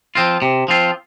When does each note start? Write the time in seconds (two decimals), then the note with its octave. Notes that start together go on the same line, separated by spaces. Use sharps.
0.15 F3 C4 F4
0.42 C3
0.68 F3 C4 F4